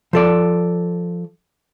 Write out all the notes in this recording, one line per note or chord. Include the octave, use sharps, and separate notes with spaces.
F3 A4 D5